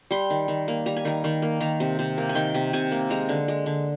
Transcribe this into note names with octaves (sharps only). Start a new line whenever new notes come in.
G3 C6
D#3
D#3
A#3
G3 A#5
G#5
D#3 A#5
D#3
A#3
D#3 A#5
C3
C3
A#3
G#5
D#3 G5
C3
C3 G#5
A#3
G#3 A#5
D3
G#3
D3